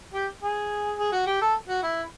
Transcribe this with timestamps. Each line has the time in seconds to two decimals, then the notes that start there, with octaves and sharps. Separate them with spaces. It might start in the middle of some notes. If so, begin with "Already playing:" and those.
0.14 G4
0.42 G#4
0.98 G#4
1.12 F#4
1.26 G4
1.41 A4
1.68 F#4
1.83 E4